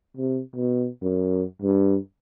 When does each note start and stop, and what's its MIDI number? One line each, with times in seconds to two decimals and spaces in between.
0.17 0.40 48
0.56 0.88 47
1.02 1.44 42
1.62 1.97 43